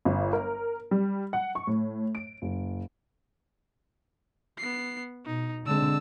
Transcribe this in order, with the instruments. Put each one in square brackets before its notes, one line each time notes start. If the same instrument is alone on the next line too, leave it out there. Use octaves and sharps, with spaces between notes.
[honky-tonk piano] G1
A#4
G3
F#5
C#6
A2
D7
F#1
[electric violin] B3 C7
[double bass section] B2 [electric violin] D#4
[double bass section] D3 G#3 C4 [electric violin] A5 E6